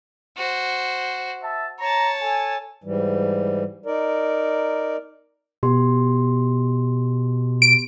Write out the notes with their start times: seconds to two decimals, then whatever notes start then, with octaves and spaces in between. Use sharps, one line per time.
0.37 F#4 C5
1.42 E5 A5
1.80 C#5 A5 A#5
2.22 A4 G#5
2.84 G#2 E3 G3
3.86 D#4 A#4 D5
5.63 B2 B3 G4 C6
7.62 D7